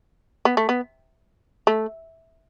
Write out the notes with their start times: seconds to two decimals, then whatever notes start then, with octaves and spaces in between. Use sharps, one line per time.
0.45 B3
0.57 A3
0.69 B3
1.67 A3